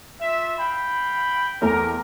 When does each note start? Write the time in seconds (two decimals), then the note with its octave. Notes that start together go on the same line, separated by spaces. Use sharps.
0.21 F4 E5
0.58 F5 G5 B5
1.62 E2 A3 G4 A#4 A#5